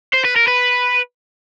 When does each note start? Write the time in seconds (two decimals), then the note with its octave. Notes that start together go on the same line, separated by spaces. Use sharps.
0.13 C5
0.24 B4
0.36 A#4
0.47 B4